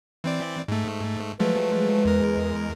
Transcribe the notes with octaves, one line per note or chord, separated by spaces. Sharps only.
E3 C4 D5
G#2 A3
F3 F#3 G#3 A3 B4
E2 A#4